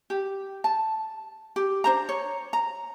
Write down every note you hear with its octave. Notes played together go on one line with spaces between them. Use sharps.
G4
A5
G4
D4 C5 A#5
C#5
A#5